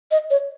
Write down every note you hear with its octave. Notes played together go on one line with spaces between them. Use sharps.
D#5
C#5